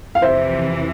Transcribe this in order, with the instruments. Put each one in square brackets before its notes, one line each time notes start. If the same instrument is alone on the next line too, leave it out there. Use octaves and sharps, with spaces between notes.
[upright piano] F5
[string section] F2 C3 E3 [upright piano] C5 E5